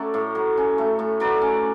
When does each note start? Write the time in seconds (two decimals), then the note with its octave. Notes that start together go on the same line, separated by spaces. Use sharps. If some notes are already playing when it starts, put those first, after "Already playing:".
Already playing: F#3 A3 C#4 D5 F#5
0.14 A2
0.35 F#3
0.57 C#4
0.78 A3
0.99 A2
1.20 F#3 B4 D5
1.41 C#4